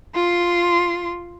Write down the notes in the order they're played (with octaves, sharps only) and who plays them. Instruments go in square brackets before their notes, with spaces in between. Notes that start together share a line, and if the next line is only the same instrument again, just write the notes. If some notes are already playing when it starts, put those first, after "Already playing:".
[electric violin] F4 C6